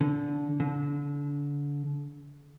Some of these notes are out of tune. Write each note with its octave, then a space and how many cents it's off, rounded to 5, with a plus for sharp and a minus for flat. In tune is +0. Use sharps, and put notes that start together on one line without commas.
D3 -20
D3 -30